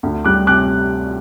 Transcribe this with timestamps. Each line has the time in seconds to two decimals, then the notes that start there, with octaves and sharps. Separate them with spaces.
0.03 D2
0.25 G3 D6 F#6
0.47 C3 D6 F#6